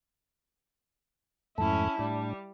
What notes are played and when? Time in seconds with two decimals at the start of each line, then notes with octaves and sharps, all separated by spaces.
1.58 F2 G#2 A3 C#4 E4 A5
1.99 A2 G3 D4